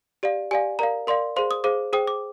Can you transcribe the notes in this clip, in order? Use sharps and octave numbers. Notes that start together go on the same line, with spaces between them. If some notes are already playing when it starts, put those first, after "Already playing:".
G4 D5 F5
G4 D5 F5 G#5
A#4 D5 F5 A#5
A#4 D5 F5 C6
G#4 C5 F5 C6
D#6
G#4 C5 F5 D6
G#4 C5 G5 D#6
D6